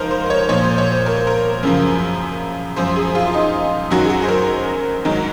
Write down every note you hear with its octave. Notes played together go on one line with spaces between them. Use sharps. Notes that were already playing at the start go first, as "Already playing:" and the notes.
Already playing: G#2 F3 A#4 C5
C5
C5
C#5
A#2 F3 C#5
C5
C#5
C5
A#4
C5
A#4
F#2 C#3 F3
F#2 F3 C5
G#4
F4
F4
D#4
F#2 D#3 F#3 F#4
G#4
F#4
C5
A#4
G#2 D#3 F#3